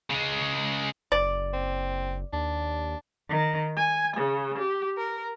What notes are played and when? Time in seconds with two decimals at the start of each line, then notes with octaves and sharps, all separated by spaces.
0.10 C#3 G#3
1.12 F#1 D5
1.53 C4
2.33 D#2 D4
3.29 D#3
3.76 G#5
4.16 C#3
4.57 G4
4.97 A#4